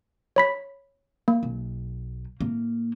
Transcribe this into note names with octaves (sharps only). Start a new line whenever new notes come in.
C#5 B5 B6
A#3
B1
A2 A#3